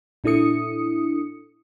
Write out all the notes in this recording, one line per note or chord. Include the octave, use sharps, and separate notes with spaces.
A#2 D4 E4 A4 D#6 C#7